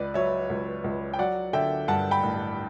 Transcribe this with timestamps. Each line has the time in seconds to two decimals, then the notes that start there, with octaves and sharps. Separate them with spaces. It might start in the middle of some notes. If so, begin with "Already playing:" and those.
Already playing: C#2 B4 D5
0.14 F#3 C#5 E5
0.50 C#2
0.84 C#2
1.14 G5
1.19 F#3 D5 F#5
1.53 D3 E5 G5
1.88 G2 F#5 A5
2.11 G5 B5
2.23 A1